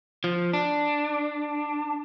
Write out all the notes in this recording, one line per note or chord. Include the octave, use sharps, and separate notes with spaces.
F3
D4